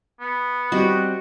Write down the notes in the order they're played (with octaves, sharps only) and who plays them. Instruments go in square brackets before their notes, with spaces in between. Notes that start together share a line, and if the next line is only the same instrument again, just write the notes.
[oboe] B3
[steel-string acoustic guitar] G3 C4 D#5 [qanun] F#4